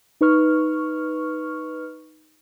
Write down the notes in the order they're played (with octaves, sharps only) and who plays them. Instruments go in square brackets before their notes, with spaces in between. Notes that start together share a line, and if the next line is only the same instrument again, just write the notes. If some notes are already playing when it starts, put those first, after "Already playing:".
[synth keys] D#4 B4 C#6 F6